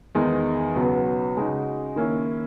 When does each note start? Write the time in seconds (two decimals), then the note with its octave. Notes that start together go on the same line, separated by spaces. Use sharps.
0.15 E2 D#3 G#3 D#4
0.76 C#2 B2 F#3 B3
1.36 C#3 G#3 D#4 F#4
1.96 D#3 A#3 C#4 E4